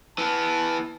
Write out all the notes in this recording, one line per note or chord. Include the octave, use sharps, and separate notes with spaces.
E3 B3 A5